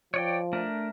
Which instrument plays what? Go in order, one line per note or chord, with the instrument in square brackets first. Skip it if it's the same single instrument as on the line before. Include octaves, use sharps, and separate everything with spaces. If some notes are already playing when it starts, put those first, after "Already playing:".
[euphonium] F3 [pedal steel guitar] C#5 D5 G5
[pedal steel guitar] A3 D4 A#4